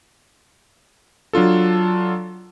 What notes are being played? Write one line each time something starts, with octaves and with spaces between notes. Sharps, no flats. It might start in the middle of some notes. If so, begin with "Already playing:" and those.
F#3 D4 F4 A4